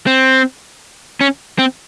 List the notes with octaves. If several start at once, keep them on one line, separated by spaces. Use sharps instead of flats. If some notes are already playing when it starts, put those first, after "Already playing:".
C4
C#4
C4